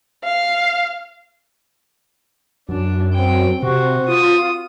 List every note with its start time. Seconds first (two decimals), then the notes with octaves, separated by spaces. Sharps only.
0.24 F5
2.69 F#2 D4
3.14 C4 G5
3.63 C3 F#4 C5
4.08 F4 D#6